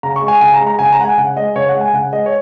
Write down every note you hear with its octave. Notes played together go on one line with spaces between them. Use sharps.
C#3 A#5
C#6
G#3
G#5
C#3 G#5
A#5
G#3
A#5
C#3 G#5
A#5
G#3 F#5
G#5
C#3 F#5
G#3 D#5
C#3 C#5
F#5
G#3
G#5
C#3 F#5
G#3 D#5
C#5